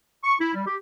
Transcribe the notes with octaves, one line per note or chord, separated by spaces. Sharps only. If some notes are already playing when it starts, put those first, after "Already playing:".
C#6
E4
G3
G4